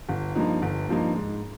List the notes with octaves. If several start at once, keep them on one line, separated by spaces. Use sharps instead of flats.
G1
G2 F3 A#3 D#4
G1
G2 F3 A#3 D#4
G#2